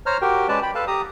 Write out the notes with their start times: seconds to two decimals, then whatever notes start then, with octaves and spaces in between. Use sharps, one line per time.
0.06 C5 C#5 A#5 F6
0.22 F#4 G4 A#4 G5
0.49 G#3 C#4 B4 D5 A5
0.63 G5 B5
0.75 A4 B4 F5 A5
0.87 G4 A#5 D#6